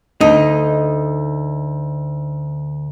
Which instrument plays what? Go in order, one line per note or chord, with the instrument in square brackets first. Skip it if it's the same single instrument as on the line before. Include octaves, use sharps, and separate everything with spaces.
[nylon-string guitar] D2 [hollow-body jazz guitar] D#4